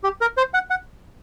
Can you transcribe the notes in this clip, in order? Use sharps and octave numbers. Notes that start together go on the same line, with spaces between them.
G4
A#4
C5
F#5
F#5